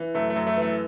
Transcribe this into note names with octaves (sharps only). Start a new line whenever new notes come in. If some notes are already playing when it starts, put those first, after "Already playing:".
Already playing: E3
F#2 A3
A3
F#2
A3
E3
A3